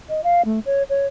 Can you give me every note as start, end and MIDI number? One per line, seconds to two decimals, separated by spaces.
0.09 0.21 75
0.24 0.42 77
0.45 0.60 57
0.66 0.83 73
0.90 1.07 73